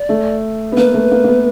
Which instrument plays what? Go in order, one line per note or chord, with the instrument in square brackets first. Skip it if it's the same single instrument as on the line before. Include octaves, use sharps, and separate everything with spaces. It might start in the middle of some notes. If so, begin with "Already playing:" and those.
Already playing: [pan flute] D5
[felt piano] A3
B3
[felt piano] A#3 [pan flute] B4
[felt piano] A3
A#3
A#3
B3